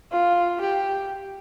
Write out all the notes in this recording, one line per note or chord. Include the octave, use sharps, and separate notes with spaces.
F4
G4